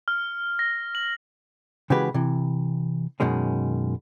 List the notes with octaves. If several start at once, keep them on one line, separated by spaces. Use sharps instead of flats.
F6
A#6
F#7
C#3 E3 G#3 F#4 G4 B4
C3 E3
F#2 B2 D#3 G#3 C#4